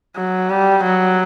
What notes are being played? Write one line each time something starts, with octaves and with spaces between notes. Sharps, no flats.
F#3
G3
F#3